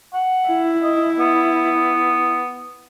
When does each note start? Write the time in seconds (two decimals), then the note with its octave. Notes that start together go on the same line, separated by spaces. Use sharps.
0.13 F#5
0.48 E4
0.82 D#5
1.19 B3